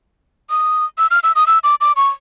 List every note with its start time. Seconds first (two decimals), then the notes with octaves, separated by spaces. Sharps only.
0.50 D#6
0.98 E6
1.11 F6
1.23 E6
1.36 D#6
1.47 E6
1.64 D6
1.81 D6
1.96 C#6